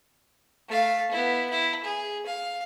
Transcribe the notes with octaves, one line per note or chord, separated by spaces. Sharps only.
A3 F5
B3 E4
E4
G#4
F5